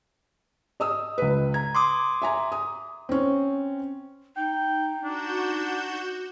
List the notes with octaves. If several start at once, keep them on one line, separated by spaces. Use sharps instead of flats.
D#5 D#6 E6
C#2 B4
A#5 G#6
C6 D6 D#6
E5 G#5 A#5
D#6
C4 C#4
D#4 G5
D4 F#4 G6 E7